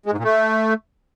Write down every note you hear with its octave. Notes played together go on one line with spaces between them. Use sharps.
G#3
G#2
A#2
A3